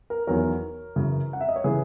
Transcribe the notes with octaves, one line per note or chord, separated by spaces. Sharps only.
A#4
E2 D#3 F#3 A#4 C#5
F#2 C#3 E3
F#5
E5
D#5
C#5
C#3 E3 G#4 B4